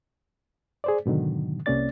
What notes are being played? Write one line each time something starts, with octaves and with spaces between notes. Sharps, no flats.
G#4 C5 D5
G#2 B2 D3 D#3 F#3
C2 C3 A#3 C#4 D5 A6